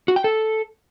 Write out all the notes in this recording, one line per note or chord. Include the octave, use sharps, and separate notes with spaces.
F#4
G5
A4